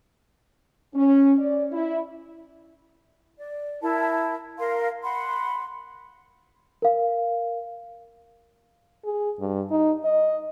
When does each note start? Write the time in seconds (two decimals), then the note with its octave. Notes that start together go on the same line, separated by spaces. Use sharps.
0.94 C#4
1.39 D5
1.71 E4
3.38 D5
3.82 E4 A#4 A5
4.58 A#4 F5 C6
5.04 F#5 B5 C6
6.82 A#4 F5
9.04 G#4
9.40 G2
9.71 D#4
10.05 D#5